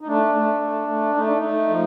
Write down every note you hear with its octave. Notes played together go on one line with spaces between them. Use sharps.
D#4
A3 D4
A3
A3
A3
A3 D#4
D4
A3 D#4
F3